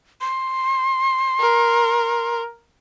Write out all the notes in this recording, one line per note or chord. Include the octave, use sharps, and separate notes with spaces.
C6
A#4